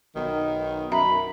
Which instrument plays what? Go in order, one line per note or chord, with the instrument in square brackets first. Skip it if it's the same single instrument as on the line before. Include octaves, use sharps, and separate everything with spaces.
[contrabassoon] B1 [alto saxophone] D#3
[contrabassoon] F#2 [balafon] E5 A#5 [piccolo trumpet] B5